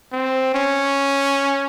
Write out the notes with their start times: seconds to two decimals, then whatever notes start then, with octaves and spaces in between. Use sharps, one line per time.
0.12 C4
0.54 C#4